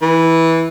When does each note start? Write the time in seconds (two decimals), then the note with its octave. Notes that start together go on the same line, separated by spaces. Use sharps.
0.02 E3